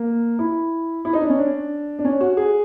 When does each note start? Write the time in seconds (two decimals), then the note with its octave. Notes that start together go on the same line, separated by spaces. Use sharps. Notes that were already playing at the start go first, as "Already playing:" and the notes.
Already playing: A#3
0.39 E4
1.05 E4
1.13 D#4
1.21 D4
1.30 C#4
1.38 D4
1.99 D4
2.05 C#4
2.21 F#4
2.37 G#4